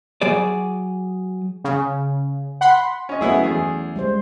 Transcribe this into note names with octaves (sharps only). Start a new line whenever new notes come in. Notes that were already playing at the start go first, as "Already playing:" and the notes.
F#3 G#4 D5
C#3
F#5 B5 C6
C#4 D#5
F#3 A3 B3 C#4 E4 G#4
E2 G#4
G3 G#3 C5